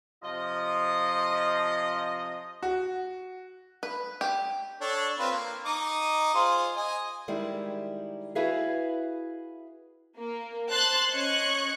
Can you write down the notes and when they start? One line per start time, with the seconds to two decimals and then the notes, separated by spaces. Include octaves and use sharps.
0.23 C3 F3 F4 D#5
2.63 F#4
3.83 B4
4.21 G4
4.81 D4 A4 C#5
5.19 C4 F4 B4
5.31 A#3
5.65 D#4 D#5 D6
6.34 F4 G#4 C5
6.76 D#5 G#5
7.28 D#3 G3 G#3 E4
8.35 E4 F#4 G#4 B4 E5 F5
10.17 A#3
10.70 C5 A5 C6 F#6 A6
11.14 C#4 D#5 C#6 F#6 G#6 C#7